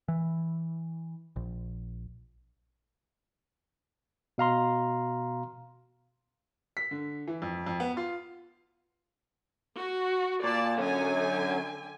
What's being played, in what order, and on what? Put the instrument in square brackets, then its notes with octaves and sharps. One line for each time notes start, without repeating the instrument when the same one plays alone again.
[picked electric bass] E3
A#1
[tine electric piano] B2 F5 A#5 C6
[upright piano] B6
D3
E3
F2
F2
B3
F4
[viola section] F#4
[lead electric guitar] A#2 [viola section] D5 A5
[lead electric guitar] F#2 C#4 [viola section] D3 G#5